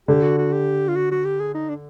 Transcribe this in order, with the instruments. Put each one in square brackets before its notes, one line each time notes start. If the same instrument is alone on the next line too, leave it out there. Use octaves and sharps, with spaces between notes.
[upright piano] D3 [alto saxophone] G4
[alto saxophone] F#4
F#4
G4
F4
F#4
F#4
G4
G#4
D#4
D4